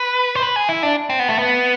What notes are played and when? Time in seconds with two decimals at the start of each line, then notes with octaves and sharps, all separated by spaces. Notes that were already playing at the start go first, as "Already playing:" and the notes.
Already playing: B4
0.35 C5
0.43 B4
0.56 G#4
0.69 E4
0.83 D4
1.10 C4
1.19 B3
1.29 A3
1.39 B3